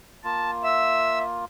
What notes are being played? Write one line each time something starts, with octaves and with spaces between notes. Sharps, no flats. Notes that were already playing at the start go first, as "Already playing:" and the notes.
A#3 F4 A5
E5 E6